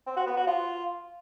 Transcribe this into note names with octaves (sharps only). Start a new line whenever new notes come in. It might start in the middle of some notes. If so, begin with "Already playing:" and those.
C4
F#4
B3
F#4
F4